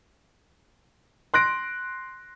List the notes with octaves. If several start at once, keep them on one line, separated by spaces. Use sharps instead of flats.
C6 F#6 A#6 D7